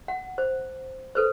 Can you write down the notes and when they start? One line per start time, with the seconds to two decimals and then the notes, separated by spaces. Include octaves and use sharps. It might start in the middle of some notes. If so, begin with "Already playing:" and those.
0.08 F#5
0.38 C5
1.15 A4 B4 C5